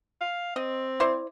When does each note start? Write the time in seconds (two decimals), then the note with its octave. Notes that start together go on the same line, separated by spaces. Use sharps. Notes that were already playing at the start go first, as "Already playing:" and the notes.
0.21 F5
0.56 C4 D#5
1.00 E4 C5 D5